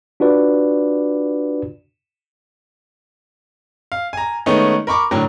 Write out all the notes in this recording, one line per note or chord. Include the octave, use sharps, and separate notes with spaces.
D4 F4 F#4 B4 D5
F5
G#5 A#5
D#3 G#3 A3 B3 C#4 D#4
A#4 B5 C#6 D6
A2 D3 F#3 A#4